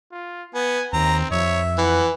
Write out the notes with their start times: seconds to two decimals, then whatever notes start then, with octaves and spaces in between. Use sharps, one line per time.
0.12 F4
0.55 B3 G#5
0.93 D#2 C4 A#5
1.31 F2 C#5 E5
1.78 E3 F#5